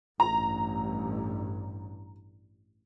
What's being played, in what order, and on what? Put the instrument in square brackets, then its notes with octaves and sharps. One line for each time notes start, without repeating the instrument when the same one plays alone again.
[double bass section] A1 G2 [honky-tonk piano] A#5